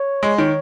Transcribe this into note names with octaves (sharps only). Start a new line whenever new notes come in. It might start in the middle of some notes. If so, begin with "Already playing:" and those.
Already playing: C#5
G#3
D#3 C#5